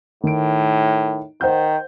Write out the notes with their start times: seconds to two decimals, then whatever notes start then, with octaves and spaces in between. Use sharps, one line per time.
0.23 A2 D#3 D7
1.41 D#3 C5 F#5 G6